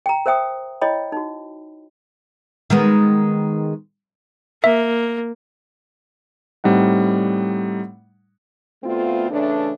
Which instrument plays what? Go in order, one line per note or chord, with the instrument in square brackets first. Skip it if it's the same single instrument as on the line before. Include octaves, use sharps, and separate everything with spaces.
[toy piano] G5 A#5
A#4 C5 E5 G5 D#6
E4 C#5 D#5 G5 B5
D#4 F#4
[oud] D#3 G#3 B3
[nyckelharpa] A#3 [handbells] E5
[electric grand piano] A2 G3 C4 D#4 F#5
[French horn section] D2 A3 B3 C4 F4
C#3 E3 A3 D4